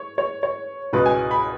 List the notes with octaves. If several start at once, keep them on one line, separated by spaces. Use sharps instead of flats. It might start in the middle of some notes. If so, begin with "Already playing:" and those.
Already playing: C#5
C#5
C#5
C#2 B2 G#3 B4
G#5
B5